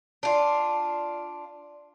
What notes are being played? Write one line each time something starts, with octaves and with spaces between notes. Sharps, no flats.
D4 F4